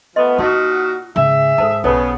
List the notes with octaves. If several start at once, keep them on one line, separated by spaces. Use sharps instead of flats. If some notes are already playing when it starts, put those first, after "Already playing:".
F3 A3 B3 D#5 C6
A#2 D#4 F4 F#4 D#5 A5 C6
G#2 C#3 G#4 E5
G#2 A4 C5 A5
B1 C#3 B3 A4 C#5 A5